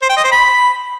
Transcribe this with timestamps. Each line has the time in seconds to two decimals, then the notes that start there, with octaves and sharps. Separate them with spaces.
0.02 C5
0.09 G5
0.17 D#5
0.24 C5
0.32 B5